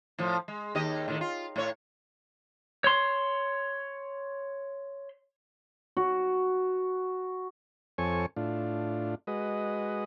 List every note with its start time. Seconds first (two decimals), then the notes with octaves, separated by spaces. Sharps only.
0.19 A2 F3
0.48 G#3
0.75 D#2 G4 D#5
1.08 A2 D#3
1.21 F4
1.56 A2 C#5
2.84 C#5 C6
5.97 F#4
7.98 F2 C4 A4 C#5 G#5 C#6
8.36 A2 D4 F4
9.27 G#3 F#4 B4 D#5